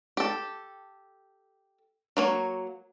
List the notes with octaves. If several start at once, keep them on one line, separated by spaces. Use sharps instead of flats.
G4 A4
F#3 A#3 C#5